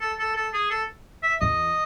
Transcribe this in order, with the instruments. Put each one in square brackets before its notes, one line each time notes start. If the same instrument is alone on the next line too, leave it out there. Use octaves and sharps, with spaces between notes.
[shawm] A4
A4
A4
G#4
A4
E5
[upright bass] E2 [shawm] D#5